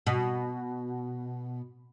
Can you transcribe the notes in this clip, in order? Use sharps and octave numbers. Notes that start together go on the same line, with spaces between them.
B2